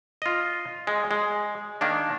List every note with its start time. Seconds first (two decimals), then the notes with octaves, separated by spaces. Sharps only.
0.22 F4 D#5
0.87 G#3
1.11 G#3
1.81 D#3 A#3 D4